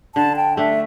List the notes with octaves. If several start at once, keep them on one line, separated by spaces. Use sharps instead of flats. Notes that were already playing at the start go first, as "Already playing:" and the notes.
D3 A5
G5
A3 D4 E5